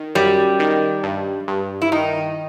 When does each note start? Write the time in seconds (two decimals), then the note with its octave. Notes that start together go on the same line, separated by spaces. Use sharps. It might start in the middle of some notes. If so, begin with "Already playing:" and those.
Already playing: D#3
0.15 F#2 G3
0.60 D#3
1.04 G2
1.48 G2
1.82 E4
1.92 D#3 D#4